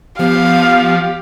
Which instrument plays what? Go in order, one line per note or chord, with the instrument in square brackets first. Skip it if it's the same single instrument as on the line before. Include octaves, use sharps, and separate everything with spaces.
[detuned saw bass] F3 [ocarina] B3 [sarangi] G4 [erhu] F5